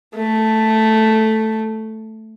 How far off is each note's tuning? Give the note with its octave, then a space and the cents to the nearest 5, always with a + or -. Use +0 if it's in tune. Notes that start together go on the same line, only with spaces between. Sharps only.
A3 +0